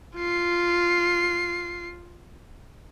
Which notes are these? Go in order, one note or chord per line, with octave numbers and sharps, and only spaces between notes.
F4 C7